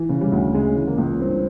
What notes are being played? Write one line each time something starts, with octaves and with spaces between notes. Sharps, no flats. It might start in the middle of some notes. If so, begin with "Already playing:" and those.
Already playing: E3
C#3
G3
D2
C#3 G#3
E3
A#3
C#2
G2 C4